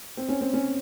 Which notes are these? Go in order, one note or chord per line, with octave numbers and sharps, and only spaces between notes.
C4
C#4
C4
C#4